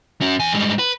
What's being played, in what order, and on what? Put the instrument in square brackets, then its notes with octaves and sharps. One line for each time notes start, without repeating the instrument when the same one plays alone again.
[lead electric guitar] C#4 F#4
E2 G#5
G#2 G3
B4